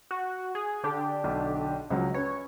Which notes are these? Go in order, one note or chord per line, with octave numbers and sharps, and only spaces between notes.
F#4
G#4
D3 D4 G4
B1
C#2 F3 F#3
C#4 B4 C#5